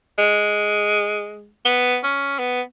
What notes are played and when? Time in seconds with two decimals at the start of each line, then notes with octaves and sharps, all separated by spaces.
0.18 G#3
1.65 B3
2.03 C#4
2.39 B3